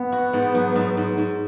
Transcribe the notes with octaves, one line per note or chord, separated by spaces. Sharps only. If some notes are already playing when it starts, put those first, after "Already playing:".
Already playing: B3
F#4
G#2
F#3
G#2
G#2
G#2